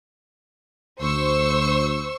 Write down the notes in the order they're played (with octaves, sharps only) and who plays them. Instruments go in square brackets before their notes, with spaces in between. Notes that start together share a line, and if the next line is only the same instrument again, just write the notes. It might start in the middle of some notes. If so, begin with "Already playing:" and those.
[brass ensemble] D2 [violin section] C5 C#6 E6